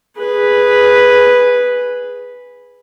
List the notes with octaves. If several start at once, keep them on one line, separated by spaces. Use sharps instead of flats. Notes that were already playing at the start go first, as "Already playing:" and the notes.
G#4 B4